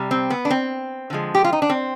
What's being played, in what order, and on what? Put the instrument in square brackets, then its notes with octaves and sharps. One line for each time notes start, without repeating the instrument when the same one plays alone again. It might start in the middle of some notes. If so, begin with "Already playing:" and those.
Already playing: [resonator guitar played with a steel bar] C3 G3
C4
B3
D4
C4
D3 F3 G#3
G4
F4
D#4
D4
C4